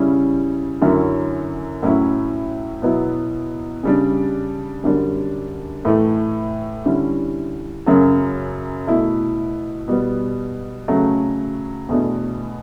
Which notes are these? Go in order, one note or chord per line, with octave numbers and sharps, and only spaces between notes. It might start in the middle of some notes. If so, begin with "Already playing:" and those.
Already playing: C#3 G3 C#4 E4
F#2 D3 F#3 C#4 E4
A2 F#3 C#4 E4
B2 F#3 B3 E4
C#3 G3 D4
F#2 D3 G3 D4
A2 E3 A3
D3 G3 C#4 E4
F#2 C#3 F#3
B2 A3 E4
B2 G3 B3
C#3 F#3 A3
E2 B2 A3 D4